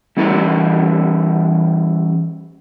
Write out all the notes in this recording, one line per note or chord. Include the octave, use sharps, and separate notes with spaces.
E3 G3 C#4 E4 G#4 A#4